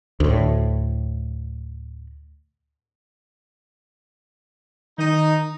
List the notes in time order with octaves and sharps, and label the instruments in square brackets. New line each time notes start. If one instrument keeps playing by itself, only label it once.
[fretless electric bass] D2 A2
[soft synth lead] D#3 [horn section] D#4